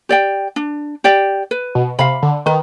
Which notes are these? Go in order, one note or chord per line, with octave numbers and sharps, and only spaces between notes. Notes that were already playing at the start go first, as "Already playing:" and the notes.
G4 D5 G5
D4
G4 D5 G5
B4
B2
C3 F5 B5
D3
D#3 B4